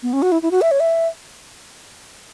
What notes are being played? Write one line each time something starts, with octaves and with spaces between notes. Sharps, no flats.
B3
C#4
F#4
E4
E4
F#4
E5
C#5
E5